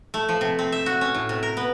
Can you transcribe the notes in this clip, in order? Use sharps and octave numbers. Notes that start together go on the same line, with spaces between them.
A3
F3
C3
C4
E5
F#4
C#4
A2
C3
A#4
B3